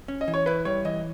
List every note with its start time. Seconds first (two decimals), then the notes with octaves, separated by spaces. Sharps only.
0.08 C#4
0.21 D#5
0.28 E3
0.34 C#5
0.46 E4 B4
0.65 G3 C#5
0.85 E3 D#5